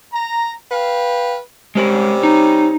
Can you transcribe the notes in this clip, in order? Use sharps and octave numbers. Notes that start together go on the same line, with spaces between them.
A#5
B4 F5 G5
C3 G3 G#3 C#4 A#4
D#4